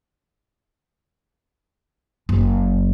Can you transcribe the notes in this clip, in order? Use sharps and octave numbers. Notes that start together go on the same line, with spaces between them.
F#1